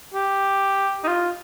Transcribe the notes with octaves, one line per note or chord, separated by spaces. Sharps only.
G4
D#4
F4